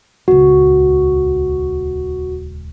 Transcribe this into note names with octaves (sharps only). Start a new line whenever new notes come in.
D#1 C#2 F#4